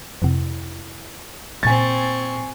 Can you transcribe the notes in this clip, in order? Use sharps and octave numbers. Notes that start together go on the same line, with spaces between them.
F2 C3 E4
A#2 C4 G#5 C#6 A6